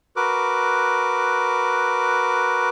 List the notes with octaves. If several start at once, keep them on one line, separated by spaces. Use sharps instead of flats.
F#4 A#4 B4 D6